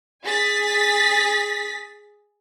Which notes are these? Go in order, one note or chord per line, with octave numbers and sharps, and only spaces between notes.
G#4 G#5 A6 B6